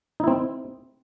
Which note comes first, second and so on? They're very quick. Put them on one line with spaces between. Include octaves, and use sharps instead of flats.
D#4 E4 C4